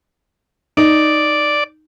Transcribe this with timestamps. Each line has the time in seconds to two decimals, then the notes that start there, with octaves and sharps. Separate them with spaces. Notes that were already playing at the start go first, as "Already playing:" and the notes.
0.77 D#4 D5